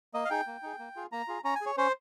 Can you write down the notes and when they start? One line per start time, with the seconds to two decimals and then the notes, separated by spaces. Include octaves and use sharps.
0.14 A#3 D#5
0.25 F5
0.30 D#4 G#4 G5
0.47 A#3
0.63 D#4 G#4
0.79 A#3
0.96 F4 G#4
1.12 A#3 A#5
1.28 F4 G#4
1.44 C#4 A#5
1.55 G#5
1.61 G#4 C#5
1.77 C#4 C5